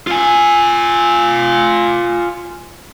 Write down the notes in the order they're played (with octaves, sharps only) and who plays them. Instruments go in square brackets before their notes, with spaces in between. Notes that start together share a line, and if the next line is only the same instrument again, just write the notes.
[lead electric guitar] F4 G#5